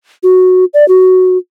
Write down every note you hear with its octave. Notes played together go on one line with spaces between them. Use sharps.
F#4
D5
F#4